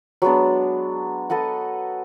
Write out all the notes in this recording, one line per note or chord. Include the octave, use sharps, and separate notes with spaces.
F#3 G#3 B3 D4
A4 B4 D#5 F#5